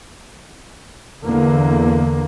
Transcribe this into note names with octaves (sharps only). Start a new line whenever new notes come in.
E2 D3 A#3